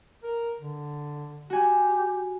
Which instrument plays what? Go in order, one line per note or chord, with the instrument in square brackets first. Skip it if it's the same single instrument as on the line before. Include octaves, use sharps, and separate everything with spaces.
[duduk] A#4
D3
[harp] F#4 G#5 [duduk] G4